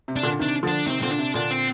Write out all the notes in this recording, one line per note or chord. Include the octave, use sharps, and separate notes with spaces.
C3
D4
A#2 D3
C3 D#3 D4
D3 F3 D4
C3 D#3 C4
A#2 D3 C4
D4
C3
A#2 D3 D4
C4